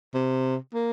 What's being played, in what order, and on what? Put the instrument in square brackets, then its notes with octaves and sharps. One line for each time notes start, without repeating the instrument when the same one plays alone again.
[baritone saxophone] C3
A#3